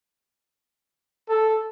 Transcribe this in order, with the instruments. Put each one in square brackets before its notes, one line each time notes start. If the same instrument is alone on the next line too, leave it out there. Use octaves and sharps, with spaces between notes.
[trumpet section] A4